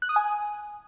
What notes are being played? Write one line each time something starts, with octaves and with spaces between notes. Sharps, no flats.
F#6
D#6
G#5